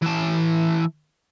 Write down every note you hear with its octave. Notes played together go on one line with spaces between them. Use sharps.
E3 A5